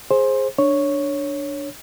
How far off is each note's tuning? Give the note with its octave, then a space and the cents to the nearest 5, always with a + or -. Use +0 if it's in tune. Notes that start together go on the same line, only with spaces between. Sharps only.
G#4 +0 C5 +15
D4 +0 C#5 +0